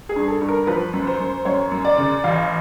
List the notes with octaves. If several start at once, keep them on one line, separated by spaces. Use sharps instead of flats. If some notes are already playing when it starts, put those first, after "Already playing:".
G#4
G2
A4
G2
A#4
F3 B4
F#2
C5
F#2
F#2 C#5
F#2
D5
C#3
A1 F5